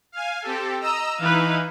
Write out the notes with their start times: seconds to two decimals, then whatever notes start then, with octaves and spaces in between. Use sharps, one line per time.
0.12 F5 G#5
0.42 C4 G4 A4
0.81 D#5 A#5 E6
1.19 E3 D#4 E4 B4 F5